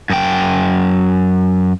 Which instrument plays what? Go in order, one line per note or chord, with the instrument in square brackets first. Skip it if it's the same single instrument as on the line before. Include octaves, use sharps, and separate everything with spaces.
[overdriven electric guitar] F#2 G5